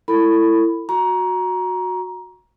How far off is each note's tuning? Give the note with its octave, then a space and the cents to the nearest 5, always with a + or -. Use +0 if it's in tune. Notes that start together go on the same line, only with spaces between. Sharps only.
E4 +20 A4 +35 B5 +5
F#4 -15 A#5 +20 C#6 +0